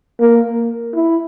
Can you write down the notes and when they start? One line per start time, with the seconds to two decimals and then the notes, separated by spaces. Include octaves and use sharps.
0.20 A#3
0.94 E4